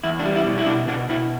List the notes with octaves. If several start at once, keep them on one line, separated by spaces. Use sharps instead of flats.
E2 E4
D4
G3
E4
B2
E4
B2 D4
B2 D4
B2 E4